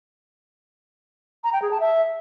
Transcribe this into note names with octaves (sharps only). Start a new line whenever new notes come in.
A#5
G5
G#4
A5
E5